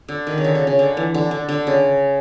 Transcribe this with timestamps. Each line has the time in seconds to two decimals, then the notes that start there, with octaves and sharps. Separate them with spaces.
0.09 D3
0.27 D#3
0.38 C#3
0.44 D3
0.55 C#3
0.67 C#3
0.79 D3
0.97 E3
1.14 D3
1.31 D3
1.49 D3
1.67 C#3